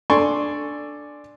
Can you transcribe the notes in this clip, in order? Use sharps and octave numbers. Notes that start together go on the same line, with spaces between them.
D4 A4 D5 G#5 C6 C#6